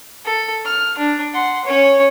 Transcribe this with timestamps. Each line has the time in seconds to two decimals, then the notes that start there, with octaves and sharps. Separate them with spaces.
0.25 A4
0.65 F6
0.98 D4
1.33 F#5 C6
1.64 C#4 C#5